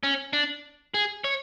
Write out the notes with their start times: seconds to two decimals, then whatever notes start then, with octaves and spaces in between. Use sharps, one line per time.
0.03 C#4
0.33 D4
0.94 G#4
1.24 C#5